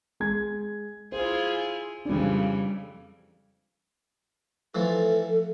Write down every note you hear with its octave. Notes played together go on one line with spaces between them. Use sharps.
G#3 G#6
E4 F4 G#4 C5
F2 C#3 E3 G3 D4
E3 F3 A3 A4